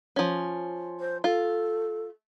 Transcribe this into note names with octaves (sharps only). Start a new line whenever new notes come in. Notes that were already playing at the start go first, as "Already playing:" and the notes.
F3 C#4
C5
F4 A4